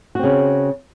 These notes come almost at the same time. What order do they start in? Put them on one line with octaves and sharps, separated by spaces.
F#4 C4 C#3